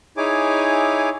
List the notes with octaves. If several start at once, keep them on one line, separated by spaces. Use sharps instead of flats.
D#4 E4 G#4 C#5 G#5 D6